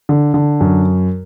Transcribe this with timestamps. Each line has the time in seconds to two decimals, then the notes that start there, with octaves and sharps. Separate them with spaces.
0.09 D3
0.34 D3
0.60 F#2